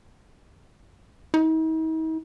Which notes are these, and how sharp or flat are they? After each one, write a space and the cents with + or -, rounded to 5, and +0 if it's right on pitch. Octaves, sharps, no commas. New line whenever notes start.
D#4 +45